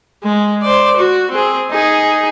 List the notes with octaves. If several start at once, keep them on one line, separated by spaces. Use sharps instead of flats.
G#3
C5 D5
F#4
C4 G#4
D#4 G#4